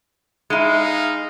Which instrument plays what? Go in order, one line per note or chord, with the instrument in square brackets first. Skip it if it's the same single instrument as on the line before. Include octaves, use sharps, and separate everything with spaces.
[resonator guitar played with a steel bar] G#3 E4 [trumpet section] D#4 F5